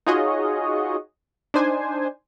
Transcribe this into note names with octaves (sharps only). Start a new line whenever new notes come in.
D#4 F4 F#4 G#4 C#5 D#5
D4 D#4 C5 G#5